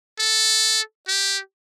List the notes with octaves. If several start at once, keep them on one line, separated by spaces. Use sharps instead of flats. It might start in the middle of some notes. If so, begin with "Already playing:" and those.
A4
G4